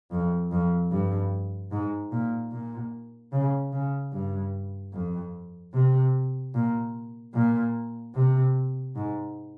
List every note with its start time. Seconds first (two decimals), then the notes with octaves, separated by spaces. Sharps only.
0.12 F2
0.52 F2
0.91 G2
1.72 G#2
2.12 A#2
2.52 A#2
3.33 C#3
3.73 C#3
4.13 G2
4.94 F2
5.74 C3
6.55 A#2
7.34 A#2
8.15 C3
8.96 G#2